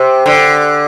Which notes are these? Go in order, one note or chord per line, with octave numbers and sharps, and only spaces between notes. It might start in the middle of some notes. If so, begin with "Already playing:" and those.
Already playing: C3
D3